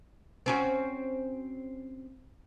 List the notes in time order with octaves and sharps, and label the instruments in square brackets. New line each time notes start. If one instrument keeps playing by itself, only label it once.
[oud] C4 C#4 F#4